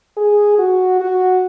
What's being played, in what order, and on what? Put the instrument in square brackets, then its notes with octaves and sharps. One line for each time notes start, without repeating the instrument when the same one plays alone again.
[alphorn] G#4
F#4
F#4